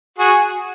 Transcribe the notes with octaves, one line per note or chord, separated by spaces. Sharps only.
F#4 G#4